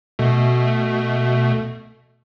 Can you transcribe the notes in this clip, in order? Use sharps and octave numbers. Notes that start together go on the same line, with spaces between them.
B2 A3